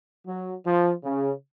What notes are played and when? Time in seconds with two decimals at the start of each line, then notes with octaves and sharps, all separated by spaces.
0.26 F#3
0.65 F3
1.04 C#3